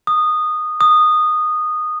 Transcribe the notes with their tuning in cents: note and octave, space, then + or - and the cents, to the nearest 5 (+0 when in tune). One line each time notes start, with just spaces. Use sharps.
D#6 -15
D#6 -15